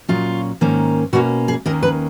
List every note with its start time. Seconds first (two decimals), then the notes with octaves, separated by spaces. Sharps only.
0.08 A#2 F#3 C#4 F4
0.61 G#2 D#3 A#3 C#4
1.13 B2 A#3 C#4 F#4
1.48 G#4
1.66 D#2 D#3 A#3 C#4 A#4
1.83 B4